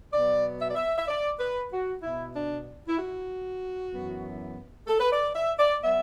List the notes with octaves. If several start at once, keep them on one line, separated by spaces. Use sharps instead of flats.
B2 F#3 B3 D5
E5
D5
E5
E5
D5
B4
F#4
B2 B3 E4
D4
E4
F#4
F#2 E3 B3
A4
B4
D5
E5
D5
F#3 B3 E5